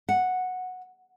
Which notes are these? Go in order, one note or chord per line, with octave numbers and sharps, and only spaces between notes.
F#5